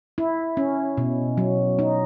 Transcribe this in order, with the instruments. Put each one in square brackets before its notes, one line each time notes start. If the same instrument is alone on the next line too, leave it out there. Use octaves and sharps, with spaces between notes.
[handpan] E4
C#4
B2
F#3
D#4